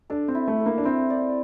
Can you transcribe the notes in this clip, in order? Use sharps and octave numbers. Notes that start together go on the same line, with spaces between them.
D4 A4
C4
E4
A3
A4
A#3
D4
C4 E4
D5